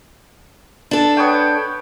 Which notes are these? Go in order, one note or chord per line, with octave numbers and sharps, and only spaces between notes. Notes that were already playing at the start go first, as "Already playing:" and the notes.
D4 A4
B3 C#5 G5